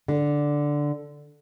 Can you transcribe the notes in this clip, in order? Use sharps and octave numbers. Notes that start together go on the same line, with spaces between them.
D3